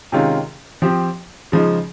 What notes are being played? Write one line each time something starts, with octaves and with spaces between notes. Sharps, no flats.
C3 D#3 G#3 C#4 F4
F3 C4 G4
C#3 F3 G#3 D#4